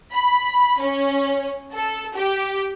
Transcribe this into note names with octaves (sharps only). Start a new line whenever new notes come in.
B5
C#4
A4
G4